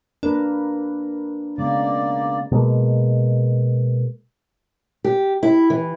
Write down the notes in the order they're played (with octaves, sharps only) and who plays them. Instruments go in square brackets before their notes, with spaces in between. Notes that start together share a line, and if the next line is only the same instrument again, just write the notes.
[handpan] A#3 A#4 B4 [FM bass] D4
[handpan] C#3 G#3 B3 [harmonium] A#3 D5
[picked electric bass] B2 G#3 A#3
[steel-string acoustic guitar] G4
E4
E3